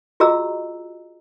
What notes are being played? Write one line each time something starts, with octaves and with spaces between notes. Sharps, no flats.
F4 F#4 G#4 D#5 A#5 E6